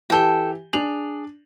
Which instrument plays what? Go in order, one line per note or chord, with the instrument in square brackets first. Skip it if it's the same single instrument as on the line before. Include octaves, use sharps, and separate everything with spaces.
[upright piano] E3 G4 G7 [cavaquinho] A4 G5
[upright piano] D4 F7 F#7 [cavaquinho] G#4